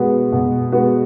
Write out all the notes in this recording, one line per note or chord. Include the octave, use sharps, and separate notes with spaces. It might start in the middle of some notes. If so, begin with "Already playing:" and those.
Already playing: B2 G#3 B3 F#4
B2
G#3 B3 F#4